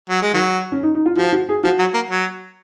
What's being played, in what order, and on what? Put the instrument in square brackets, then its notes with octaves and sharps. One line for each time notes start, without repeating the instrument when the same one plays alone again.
[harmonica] F#3
G#3
D#3 F#3
[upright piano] C#4
D#4
D#4
F4
[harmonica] F3 [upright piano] F#4
[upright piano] F#4
G#4
[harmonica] F3 [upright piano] F#4
[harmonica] F#3
A#3
F#3